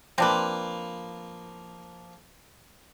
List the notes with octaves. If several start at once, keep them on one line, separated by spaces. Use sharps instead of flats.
F3 A#3 C4 D4 B4